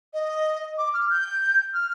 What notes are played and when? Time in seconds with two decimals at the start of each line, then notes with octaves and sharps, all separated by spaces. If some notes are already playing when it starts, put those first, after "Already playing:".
0.13 D#5
0.78 D6
0.94 F6
1.10 G6
1.74 F6